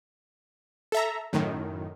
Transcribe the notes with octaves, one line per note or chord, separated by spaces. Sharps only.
A4 E5 A#5
F#2 A2 D#3